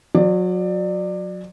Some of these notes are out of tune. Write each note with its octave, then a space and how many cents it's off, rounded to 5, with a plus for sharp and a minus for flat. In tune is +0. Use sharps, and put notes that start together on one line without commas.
F#3 -25 D5 +20